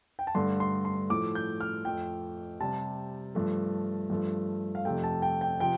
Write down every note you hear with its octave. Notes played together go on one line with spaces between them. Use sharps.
G5
A5
G2 D3 A3 C6
C6
C6
A2 F3 A3 D6
G6
F6
F2 F3 A3 G5
C3 G3 A5
G2 F3 A3
G2 F3 A3
F5
F2 C3 A3 G5
A5
G5
G5
C3 F3 G5